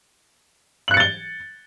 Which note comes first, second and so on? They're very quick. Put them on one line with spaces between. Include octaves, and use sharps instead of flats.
F#7 F#6 C#7 A6 G7